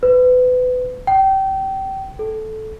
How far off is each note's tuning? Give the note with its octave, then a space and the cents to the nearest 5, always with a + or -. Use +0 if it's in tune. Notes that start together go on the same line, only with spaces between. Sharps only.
B4 +30
G5 -25
A4 -15